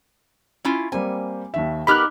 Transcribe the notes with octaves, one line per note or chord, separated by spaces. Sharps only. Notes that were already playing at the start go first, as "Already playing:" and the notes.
C#4 E4 F4
G3 A#3 C4 G#5
D#2 D#3 E5
B3 D#4 G4 A#4 B5 F6 F#6